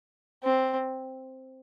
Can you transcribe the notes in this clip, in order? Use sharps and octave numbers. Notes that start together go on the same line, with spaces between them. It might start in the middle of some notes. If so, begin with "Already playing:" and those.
C4